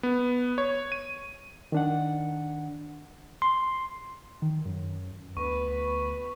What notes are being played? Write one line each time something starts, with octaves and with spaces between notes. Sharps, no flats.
B3
C#5
D#7
D#3 D4 F#5
C6
D#3
F#2
D2 B3 B4 C#6